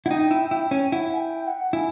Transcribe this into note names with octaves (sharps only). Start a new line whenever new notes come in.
E4 F#5
D#4 G5
E4
E4 G5
C#4
E4 F#5
G#5
G5
F#5
E4 G#5